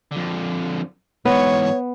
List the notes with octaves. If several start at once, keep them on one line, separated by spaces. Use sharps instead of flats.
F2 D3
G#2 E3 B3 C#5